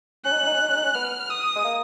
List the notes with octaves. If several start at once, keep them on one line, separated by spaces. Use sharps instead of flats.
C#4 F#6
D#4
C#4
D#4
C#4
D#4
C#4
D#4
C#4
B3 F6
D#6
G#3
A#3